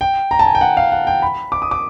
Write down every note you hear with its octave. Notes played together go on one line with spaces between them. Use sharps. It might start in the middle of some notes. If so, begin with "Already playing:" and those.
G5
A#5
A5
G#5
G5
F#5
F5
F#5
G5
B5
D6
D#6
D6